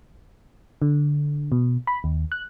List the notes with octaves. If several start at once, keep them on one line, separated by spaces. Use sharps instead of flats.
D3
B2
B5
D#2
F#6